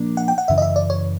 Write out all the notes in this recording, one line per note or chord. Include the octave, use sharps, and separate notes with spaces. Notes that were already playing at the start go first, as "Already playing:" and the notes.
Already playing: A#2 F3 A#3 D4
F#5
G5
F#5
F#2 C#3 E3 E5
D#5
E5
D5
C#5